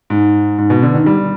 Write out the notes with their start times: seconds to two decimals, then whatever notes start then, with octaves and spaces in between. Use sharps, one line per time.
0.10 G#2
0.58 G#2
0.70 B2
0.82 D3
0.94 D#3
1.06 G3